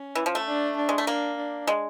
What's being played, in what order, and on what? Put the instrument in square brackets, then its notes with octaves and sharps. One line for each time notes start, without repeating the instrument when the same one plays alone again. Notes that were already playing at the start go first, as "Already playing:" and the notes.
Already playing: [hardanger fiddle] C#4
[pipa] E3
F3
A3
[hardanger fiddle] D4
D4
[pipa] G#3
A3
[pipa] A#3 [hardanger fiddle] D4
[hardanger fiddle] D4
[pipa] G#3